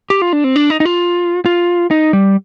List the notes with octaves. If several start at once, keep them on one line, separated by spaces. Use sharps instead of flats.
G4
F4
D4
C4
D4
D#4
D#4
F4
F4
D#4
G3